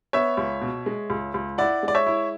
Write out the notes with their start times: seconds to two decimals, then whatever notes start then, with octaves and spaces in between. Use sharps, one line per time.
0.13 B3 C#5 E5
0.37 C#2
0.61 B2
0.86 G#3
1.10 C#2
1.34 C#2
1.58 E4 D5 F#5
1.83 G#3
1.88 D5
1.94 C#5 E5
2.07 E4